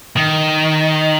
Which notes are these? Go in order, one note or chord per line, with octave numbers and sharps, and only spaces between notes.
D#3